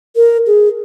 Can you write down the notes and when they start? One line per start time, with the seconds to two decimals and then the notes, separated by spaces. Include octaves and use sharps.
0.16 A#4
0.47 G#4